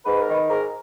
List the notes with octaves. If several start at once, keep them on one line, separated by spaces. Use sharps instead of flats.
G#2 B4
A#4
D#3
B4
G#2 A#4